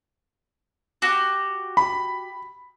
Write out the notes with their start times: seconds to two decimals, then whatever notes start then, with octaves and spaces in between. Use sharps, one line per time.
1.02 F#4 G4
1.77 B5